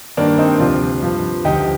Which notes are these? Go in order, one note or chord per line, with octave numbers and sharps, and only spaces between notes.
G2 D#3 A#3 D4
C4 D#4
D2 C3 F3 D4 F4
G2 F3
D2 D3 F3 D#4 G4